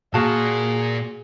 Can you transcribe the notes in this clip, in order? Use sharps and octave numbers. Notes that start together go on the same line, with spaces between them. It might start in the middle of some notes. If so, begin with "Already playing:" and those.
A#2 A#3 F#4 G#4 F5 A5